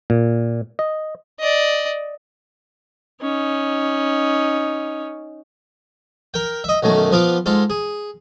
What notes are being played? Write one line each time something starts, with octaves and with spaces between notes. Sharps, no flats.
A#2
D#5
D5 D#5
C#4 D#4
A#4 G5
D#5 E5
B1 F#2 D#3 A3
F3 B3 F4 F5 D6
G#2 F4 A4
G#4